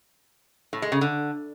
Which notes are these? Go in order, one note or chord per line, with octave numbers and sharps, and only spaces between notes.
A2
G#3
C#3
D3